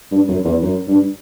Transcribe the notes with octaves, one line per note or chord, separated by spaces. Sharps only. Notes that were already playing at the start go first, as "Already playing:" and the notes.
G2
F#2
E2
F#2
G2